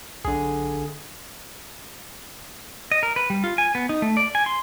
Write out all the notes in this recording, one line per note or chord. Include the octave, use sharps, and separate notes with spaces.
B1 D3 G#4
D#5
A#4
B4
G3
F4
G#5
B3
D#4
A3
D5
G#5
C6